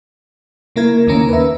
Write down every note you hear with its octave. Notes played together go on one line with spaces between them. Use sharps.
C#3 A#3 E4 A#4 G#6
D#2 D#3 A#3 C#4 A#5
B4 E5